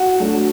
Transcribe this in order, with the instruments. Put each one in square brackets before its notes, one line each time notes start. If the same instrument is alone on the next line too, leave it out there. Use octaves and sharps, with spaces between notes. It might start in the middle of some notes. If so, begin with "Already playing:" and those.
Already playing: [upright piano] F#4
[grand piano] F#3 A3 D4